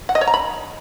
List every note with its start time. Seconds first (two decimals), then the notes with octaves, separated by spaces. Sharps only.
0.09 F#5
0.15 D#5
0.21 C#5
0.27 A#5
0.34 B5